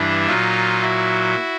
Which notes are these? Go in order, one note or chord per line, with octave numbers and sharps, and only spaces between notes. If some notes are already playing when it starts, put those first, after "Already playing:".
Already playing: G2 E3 D4 E4
A#2 F#3 D#4 F4
E4 F#4